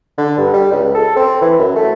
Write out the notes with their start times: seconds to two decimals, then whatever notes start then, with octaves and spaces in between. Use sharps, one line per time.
0.18 D3
0.38 G2
0.53 G3
0.72 C#2
0.95 A4
1.16 C4
1.41 E3
1.59 F#2
1.76 A3